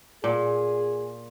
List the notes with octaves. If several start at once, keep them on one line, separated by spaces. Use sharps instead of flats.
A#2 G#4